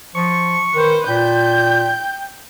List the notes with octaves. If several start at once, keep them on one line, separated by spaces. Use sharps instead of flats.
F3 C#6
D#3 B4 C5
A#2 G5 G6